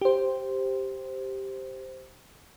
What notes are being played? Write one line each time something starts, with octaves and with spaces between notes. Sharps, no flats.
G4 C5